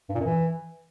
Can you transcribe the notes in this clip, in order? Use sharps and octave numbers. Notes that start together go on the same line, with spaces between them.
G2
A#2
F#2
E3